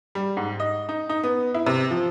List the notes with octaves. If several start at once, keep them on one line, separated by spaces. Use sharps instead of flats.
G3
G#2
D#5
D#4
D#4
B3
E4
C3
F3